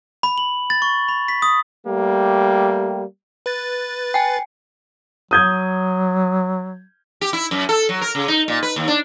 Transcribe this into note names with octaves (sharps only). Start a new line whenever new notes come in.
B5
F#7
A6
C#6
B5
B6
D#6
G3 A3 A#3 G4
B4 A6
G5 G#5
F#3 D#6 G6 G#6
G4
E4
F#2
A4
F#3
A#4
C#3
D#4
A#2
B4
D#2
D4